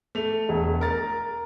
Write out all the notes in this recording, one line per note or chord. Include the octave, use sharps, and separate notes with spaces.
A3 F7
E1
A#4 A6